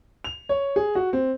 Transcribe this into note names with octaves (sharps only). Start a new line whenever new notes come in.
F7
C#5
G#4
F#4
C4